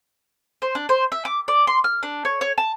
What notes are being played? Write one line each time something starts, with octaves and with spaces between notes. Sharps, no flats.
C5
D4
C5
E5
D6
D5
C6
F6
D4
C#5
C#5
A5